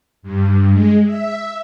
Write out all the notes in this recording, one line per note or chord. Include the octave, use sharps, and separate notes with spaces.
G2
G#3
E5